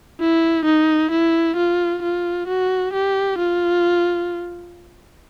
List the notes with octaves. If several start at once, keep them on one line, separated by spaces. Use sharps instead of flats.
E4
D#4
E4
F4
F4
F#4
G4
F4